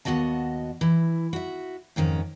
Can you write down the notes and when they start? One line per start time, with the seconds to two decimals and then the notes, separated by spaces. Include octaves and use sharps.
0.05 D#2 F#3 B3 F#4 D#5 A5
0.81 E3 E4
1.33 F#4 E5
1.96 F2 G#2 D#3 C#4